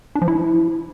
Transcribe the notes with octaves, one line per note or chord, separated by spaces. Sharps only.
D4
F3
E4